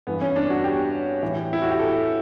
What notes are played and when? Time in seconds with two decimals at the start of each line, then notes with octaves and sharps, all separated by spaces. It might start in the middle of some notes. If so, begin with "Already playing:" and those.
0.07 G2 E3 B3
0.21 C#4
0.36 D4
0.50 F#4
0.64 G4
1.22 A2 E3
1.53 E4
1.62 F#4
1.71 G4
1.79 A4